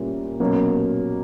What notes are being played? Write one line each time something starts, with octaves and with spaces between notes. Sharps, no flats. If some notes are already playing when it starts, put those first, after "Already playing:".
Already playing: A#2 G3 A#3 C#4 E4
B2 F#3 A#3 C#4